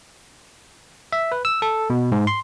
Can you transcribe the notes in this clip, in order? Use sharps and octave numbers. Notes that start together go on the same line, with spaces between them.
E5
B4
E6
A4
B2
G#2
C6